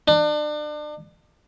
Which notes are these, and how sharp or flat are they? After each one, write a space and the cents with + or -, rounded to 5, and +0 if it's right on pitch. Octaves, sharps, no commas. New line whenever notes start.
D4 +35